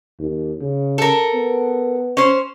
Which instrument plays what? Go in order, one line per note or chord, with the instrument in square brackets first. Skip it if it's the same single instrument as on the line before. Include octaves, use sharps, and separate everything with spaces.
[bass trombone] D#2
C#3
[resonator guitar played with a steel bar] A4 A#4
[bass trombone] B3
[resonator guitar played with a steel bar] C#4 C5